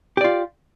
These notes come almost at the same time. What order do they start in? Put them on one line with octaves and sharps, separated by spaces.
G4 D5 F4